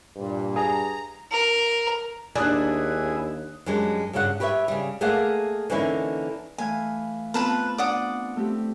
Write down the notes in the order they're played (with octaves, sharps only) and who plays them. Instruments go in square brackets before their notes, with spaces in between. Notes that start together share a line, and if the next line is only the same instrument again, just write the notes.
[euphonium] G2 [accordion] A#2
[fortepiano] G#4 [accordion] A#5
[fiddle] A#4
[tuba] D#2 [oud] D4 [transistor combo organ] E4 G#4 [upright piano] G#5 D#6 F#6
[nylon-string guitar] F#2 G3 G#3 D4
G2 C#3 F#4 B4 F#5
G4 B4 C#5 D5 E5
C#3 G3
A3 A#3 G#4 D5 F5 F#5
D3 E3 A#3 C#4 D#4 E4
[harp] E3 A3 F5 [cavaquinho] G#5
[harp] B3 C4 F4 [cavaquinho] B4 A5 B5
[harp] D4 [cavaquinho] D5 F#5 D#6
[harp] A3 C4 G4